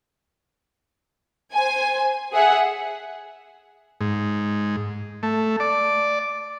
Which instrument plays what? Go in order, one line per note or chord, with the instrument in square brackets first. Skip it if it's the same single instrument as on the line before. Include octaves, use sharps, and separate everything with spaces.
[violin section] C5 G#5
G#4 E5 F#5
[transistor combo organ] G#2
A3
D5